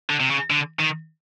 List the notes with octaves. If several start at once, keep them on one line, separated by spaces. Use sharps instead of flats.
D3
C3
C#3
D3
D#3